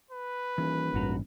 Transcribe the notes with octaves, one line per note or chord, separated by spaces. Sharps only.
B4
D#1 E3
A1 E2 G2 F#4 A#5